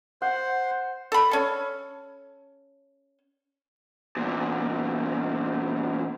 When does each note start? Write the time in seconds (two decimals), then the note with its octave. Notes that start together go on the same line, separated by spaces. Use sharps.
0.22 C5 F#5 C6
1.12 A4 B5
1.31 C#4 A4
4.17 E2 A#2